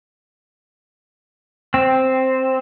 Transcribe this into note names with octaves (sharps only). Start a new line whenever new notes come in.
C4